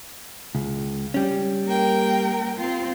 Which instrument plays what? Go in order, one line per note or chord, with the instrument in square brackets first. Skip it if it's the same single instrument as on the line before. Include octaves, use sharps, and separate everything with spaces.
[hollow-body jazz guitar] C#2
G3 C#4
[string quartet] A#3 A#4 G5
C4 F4